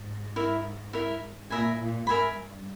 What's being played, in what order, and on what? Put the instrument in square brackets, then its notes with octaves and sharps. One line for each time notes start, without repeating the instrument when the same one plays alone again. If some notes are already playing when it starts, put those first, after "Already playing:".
Already playing: [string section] G#2
[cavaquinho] E4 A#4 E5
E4 A#4 E5
[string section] A#2 [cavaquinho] A#4 E5 G#5 B5
[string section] A#2
[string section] G#2 [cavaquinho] A#4 E5 G#5 B5
[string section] G2